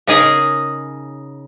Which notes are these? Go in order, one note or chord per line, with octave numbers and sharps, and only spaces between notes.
C#3 D#4 G#4 A#4